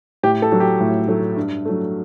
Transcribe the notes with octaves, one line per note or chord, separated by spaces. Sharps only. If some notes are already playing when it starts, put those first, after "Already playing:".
A2 G4
A4
F#3 A3
G4
A2
F#3 A3
G2
F#3 A3